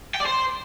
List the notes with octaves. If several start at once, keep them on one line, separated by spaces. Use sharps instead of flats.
G5
D5
C5